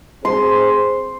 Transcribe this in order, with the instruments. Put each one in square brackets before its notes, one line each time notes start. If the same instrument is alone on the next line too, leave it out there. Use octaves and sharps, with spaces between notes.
[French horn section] C4 G#4 C5 [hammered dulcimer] C6